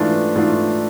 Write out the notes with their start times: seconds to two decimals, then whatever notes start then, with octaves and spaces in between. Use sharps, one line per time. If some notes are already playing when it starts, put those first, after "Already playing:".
Already playing: G#2 E3 A3 D4 F4
0.35 G#2 E3 A3 D4 F4